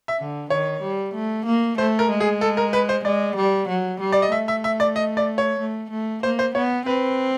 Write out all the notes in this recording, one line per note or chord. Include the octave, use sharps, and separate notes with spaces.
E5
D3
D#3 C#5
G3
A3
A#3
A3 C5
A#4
G#3
G#4
A4
A#4
B4
C5
G#3 D5
G3
F#3
G3
D5
D#5
A3 E5
E5
E5
D5
D#5
D5
C#5
A3
A3
A#3 C5
C5
B3 C#5
C4 B4